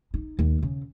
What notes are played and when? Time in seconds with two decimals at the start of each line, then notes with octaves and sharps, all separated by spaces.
0.14 D#4
0.39 D#2
0.62 C#3